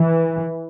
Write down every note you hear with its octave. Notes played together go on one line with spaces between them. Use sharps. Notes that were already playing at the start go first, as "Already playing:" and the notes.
Already playing: E3